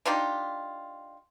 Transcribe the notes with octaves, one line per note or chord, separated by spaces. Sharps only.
D4 D#4 F4 G4